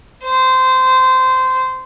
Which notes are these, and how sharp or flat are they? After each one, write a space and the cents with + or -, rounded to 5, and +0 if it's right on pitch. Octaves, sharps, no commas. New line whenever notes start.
C5 -20